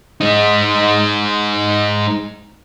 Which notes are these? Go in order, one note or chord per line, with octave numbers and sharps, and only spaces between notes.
G#3 D#4